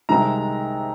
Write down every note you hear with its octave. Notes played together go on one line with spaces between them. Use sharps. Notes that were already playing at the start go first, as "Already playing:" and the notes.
C2 C3 D#3 G#3 A#5